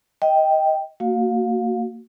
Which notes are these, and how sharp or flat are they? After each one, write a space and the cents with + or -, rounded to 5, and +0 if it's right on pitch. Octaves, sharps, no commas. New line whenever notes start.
D#5 +15 G5 +0
A#3 -25 F#4 +0 F5 +25